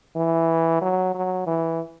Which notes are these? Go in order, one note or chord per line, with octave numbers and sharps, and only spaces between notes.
E3
F#3
F#3
E3